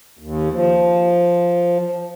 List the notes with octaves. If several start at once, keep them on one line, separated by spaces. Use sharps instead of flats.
D#2
F3